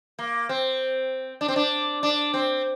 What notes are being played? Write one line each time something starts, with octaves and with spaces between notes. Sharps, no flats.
A#3
C4
D4
C4
D4
D4
C4